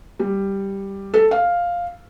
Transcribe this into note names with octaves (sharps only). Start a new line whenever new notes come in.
G3
A4
F5